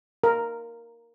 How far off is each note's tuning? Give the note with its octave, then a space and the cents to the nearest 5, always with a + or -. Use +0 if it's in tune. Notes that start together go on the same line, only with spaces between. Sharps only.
A#4 +0